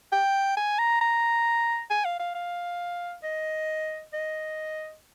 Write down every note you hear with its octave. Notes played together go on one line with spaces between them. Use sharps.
G5
G#5
A#5
A#5
G#5
F5
F5
F5
D#5
D#5